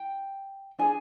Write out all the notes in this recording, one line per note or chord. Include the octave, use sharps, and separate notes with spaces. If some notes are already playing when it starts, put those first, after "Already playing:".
Already playing: G5
D4 G#4 G#5